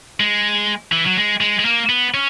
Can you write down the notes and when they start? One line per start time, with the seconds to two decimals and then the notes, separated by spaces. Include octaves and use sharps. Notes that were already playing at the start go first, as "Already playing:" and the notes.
0.20 G#3
0.92 E3
1.06 F#3
1.17 G#3
1.41 G#3
1.59 G#3
1.65 A#3
1.89 B3
2.14 C#4